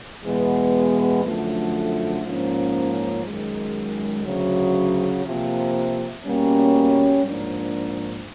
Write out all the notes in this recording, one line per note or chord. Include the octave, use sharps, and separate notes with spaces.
E2 B2 G#3 B3
F#2 D3 F3 A3
G#2 F3 A#3 C#4
F#2 D#3 G#3
D2 C#3 F#3
C3 F3 A#3
B2 G3 A#3 C#4
G#2 F3 A#3 D4